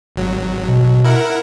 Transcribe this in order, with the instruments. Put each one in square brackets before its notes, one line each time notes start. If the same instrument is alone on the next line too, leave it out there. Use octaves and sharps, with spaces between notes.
[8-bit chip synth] G#1 F#3
[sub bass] B2
[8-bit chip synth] E4 A#4 F#5